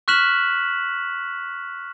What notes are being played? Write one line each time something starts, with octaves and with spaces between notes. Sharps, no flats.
C#6 F6 F#6 B6 E7 F#7